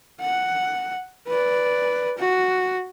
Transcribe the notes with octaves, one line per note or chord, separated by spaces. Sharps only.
F#5
B4 D5
F#4